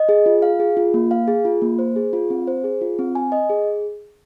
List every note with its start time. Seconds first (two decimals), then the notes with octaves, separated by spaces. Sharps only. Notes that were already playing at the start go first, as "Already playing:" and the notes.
Already playing: D#5
0.09 G#4
0.26 F4
0.42 F5
0.60 G#4
0.77 F4
0.94 A#3
1.11 F5
1.28 G#4
1.45 F4
1.62 A#3
1.79 C5
1.96 G#4
2.13 F4
2.30 C4
2.47 C5
2.64 G#4
2.81 F4
2.99 C4
3.15 G#5
3.32 D#5
3.50 G#4